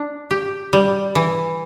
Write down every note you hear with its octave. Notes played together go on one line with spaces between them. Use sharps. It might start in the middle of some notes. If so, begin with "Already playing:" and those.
Already playing: D4
G4
G3
E3